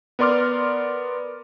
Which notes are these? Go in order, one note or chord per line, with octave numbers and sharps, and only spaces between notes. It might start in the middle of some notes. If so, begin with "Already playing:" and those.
B3 A#4 D5 C6 D6 F6